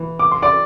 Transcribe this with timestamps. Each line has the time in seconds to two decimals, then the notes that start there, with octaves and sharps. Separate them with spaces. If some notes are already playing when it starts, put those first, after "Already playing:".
Already playing: E3
0.19 D6
0.32 C6
0.42 D5 D6